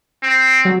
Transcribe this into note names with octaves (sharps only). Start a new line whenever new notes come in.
C4
F#3